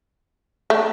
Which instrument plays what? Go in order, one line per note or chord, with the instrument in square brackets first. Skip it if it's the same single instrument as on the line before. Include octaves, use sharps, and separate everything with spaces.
[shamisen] A3